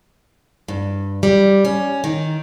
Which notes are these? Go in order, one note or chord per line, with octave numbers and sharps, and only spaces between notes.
G2
G3
C#4
D#3